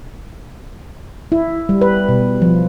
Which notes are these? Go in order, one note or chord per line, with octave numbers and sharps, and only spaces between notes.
E4
G3
B4
B2
F3